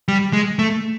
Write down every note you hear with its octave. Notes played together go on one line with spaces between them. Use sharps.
G3
G#3
A3